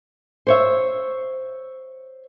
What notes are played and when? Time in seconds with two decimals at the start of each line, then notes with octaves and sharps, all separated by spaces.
0.47 C5 C#5 E5